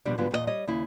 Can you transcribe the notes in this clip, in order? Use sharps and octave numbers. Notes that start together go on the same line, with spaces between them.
D#2 B2 F3 G3 D4
G#2 D3 F#3 G3 B3 F4
E2 A#2 G#4 D#5
G3 C#5 D#5
D#2 C#3 E4